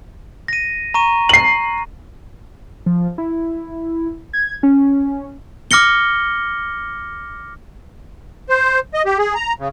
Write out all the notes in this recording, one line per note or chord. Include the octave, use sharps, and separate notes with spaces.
A#6 D#7
A#5 C#6 D#7
C7 F#7
F3
E4
G#6
C#4
D6 F6 A#6 C#7 G7
C5
D#5
G4
G#4
A#5
C#3